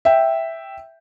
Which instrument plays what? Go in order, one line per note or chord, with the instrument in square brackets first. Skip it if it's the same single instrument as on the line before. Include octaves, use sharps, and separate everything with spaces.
[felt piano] E5 G5